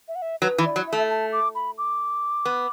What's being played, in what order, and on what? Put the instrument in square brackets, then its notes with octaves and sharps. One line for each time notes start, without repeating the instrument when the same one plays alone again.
[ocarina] E5
F#5
E5
[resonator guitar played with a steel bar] F#3 [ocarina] B4
[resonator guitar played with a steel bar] E3
[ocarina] D5
[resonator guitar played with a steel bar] F#3
[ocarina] E5
[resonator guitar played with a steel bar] A3
[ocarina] A5
D6
B5
D6
[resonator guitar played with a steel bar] B3